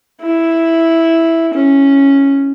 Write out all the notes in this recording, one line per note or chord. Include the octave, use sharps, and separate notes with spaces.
E4
C#4